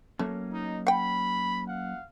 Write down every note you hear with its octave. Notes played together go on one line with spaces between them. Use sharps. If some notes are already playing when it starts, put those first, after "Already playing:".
F#3 A3 A#3 C#4
D#4
F#5 G5 B5
F5 F#5